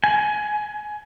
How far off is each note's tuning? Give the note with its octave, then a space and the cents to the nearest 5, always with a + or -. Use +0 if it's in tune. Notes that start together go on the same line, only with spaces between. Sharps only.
G#5 +20